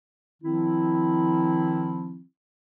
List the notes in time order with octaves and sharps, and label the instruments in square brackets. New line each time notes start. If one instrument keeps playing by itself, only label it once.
[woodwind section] D#3 F3 C4 E4